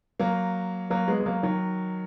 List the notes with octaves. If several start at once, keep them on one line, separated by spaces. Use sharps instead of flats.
F#3 A#3
F#3 A#3
G#3 B3
G#3
F#3 A#3
D#3 F#3